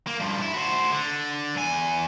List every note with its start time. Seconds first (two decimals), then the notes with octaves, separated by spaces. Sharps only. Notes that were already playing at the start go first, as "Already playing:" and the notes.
0.07 A#3
0.20 G2 F3
0.42 E4
0.54 F#4 C5
0.92 D3
1.55 E2 G#5